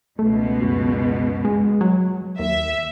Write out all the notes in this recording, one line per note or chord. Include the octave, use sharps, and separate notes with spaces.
C#2 B2 A3
F#2
G#3
F#3
D#2 E5